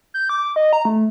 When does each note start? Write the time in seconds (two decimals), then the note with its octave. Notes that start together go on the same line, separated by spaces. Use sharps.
0.14 G6
0.29 D6
0.56 D#5
0.73 A#5
0.85 A3